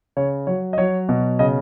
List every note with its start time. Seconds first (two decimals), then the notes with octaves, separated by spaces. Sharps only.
0.17 C#3 C#5
0.47 F#3 C#5
0.73 D#5
0.78 F#3 C#5
1.09 B2
1.39 C#3 D#5